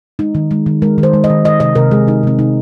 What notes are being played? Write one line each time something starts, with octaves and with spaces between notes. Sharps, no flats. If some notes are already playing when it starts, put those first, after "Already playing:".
G#3 D#4
D#3
G#3
D#3
G#3 A#4
D#3
C5
G#3
D#5
D#3
D#3 D#5
C3 D#5
C3 A#4
G#3 G#4
D#3 D#4
C3 C4
C3 D#4